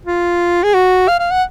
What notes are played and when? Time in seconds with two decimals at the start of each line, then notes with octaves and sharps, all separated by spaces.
0.05 F4
0.63 G#4
0.74 F#4
1.08 F5
1.20 F5
1.31 F#5